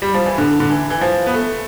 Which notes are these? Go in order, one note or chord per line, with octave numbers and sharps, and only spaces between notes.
G3
F3
E3
D3
D3
E3
E3
F3
B3
A3